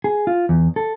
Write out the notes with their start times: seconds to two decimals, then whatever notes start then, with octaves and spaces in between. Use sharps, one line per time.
0.04 G#4
0.27 F4
0.49 E2
0.76 A4